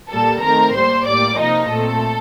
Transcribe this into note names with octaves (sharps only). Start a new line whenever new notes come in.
A#2 G3 A#3 A4 A5
D#3 A3 C4 A#4 A#5
A2 G3 A#3 C5 C6
A2 G3 A#3 D5 D6
C3 F3 A#3 D#4 D#5
A#2 A3 C4 A4